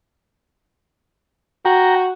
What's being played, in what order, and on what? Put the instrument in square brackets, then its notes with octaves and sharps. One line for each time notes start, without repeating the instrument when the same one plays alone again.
[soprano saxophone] F#4 [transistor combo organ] G5 A#5